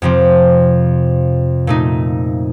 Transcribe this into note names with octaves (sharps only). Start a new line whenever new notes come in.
F2 C3 F3 C4
A#2 A3 D#4